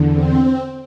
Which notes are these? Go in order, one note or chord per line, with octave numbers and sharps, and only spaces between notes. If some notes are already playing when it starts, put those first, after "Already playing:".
Already playing: E2 D3
C4